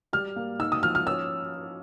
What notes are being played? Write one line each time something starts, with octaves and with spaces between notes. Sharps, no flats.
G3 F6
A#3
D#4 E6
D#6
F3 F6
F6
C#4 E6